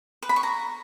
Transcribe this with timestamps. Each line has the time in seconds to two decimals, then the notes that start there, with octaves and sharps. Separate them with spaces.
0.22 B4
0.29 B5
0.36 C#6
0.43 A#5